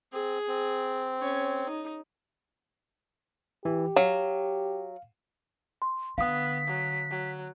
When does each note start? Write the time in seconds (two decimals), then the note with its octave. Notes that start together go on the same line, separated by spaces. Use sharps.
0.13 C4 G#4
0.48 C4
1.19 C#4 C#5
1.66 D#4
3.65 E3 G4
3.96 F#3 F5
5.82 C6
6.18 D3 B3 F5 D#6 B6
6.68 F#3
7.10 F#3